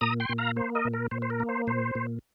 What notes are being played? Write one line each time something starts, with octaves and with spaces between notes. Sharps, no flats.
A#2 A#5 D#6
G5 C6
A#2
F5 A#5
A#3 C5
A#4 D#5
A#2
A#4
A#2 C5
C5
A#4
A#3
C5
A#2 C5
A#2